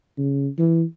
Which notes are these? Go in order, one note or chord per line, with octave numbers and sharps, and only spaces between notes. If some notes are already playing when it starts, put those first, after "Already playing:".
C#3
E3